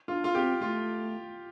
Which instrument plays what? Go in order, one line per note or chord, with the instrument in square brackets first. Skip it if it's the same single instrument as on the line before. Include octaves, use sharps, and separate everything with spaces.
[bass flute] D4 [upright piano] F4
[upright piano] F4
[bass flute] C4 [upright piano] G4
[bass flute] A3 [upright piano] F4